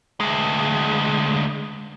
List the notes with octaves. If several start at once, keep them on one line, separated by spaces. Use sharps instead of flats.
D2 G#3